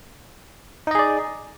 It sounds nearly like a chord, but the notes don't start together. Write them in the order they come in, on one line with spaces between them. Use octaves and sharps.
D#4 D#5 G#4 D5